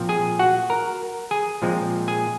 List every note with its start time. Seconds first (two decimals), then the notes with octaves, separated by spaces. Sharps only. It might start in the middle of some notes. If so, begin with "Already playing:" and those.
Already playing: A#2 F3 C4
0.09 G#4 G#5
0.39 F#4 F#5
0.70 A#4 A#5
1.31 G#4 G#5
1.62 A#2 F3 G#3 C4
2.08 G#4 G#5